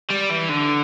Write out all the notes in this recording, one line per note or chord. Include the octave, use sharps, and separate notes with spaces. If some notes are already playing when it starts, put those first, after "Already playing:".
G3
E3
D3